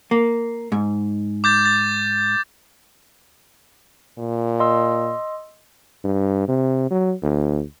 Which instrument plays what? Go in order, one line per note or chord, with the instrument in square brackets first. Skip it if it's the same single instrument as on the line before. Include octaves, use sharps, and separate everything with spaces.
[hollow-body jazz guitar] A#3
G#2
[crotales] D6 G6 A6
A6
[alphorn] A#2
[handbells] D#5 C6 E6
[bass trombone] G2
C3
F#3
D2